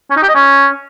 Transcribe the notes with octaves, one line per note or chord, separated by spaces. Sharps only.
C#4
D#4
G4
D#5
C#4